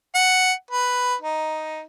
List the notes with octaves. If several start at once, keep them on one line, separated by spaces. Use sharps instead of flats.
F#5
B4
D#4